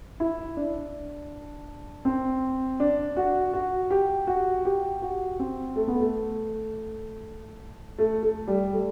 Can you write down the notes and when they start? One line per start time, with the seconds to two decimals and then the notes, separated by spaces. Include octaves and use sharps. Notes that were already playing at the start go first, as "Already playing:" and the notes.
0.20 E4
0.57 D4
2.05 C4
2.80 D4
3.17 F#4
3.53 F#4
3.91 G4
4.27 F#4
4.65 G4
5.02 F#4
5.39 C4
5.76 A3
5.88 B3
6.00 A3
7.99 A3
8.23 A3
8.47 G3
8.73 A3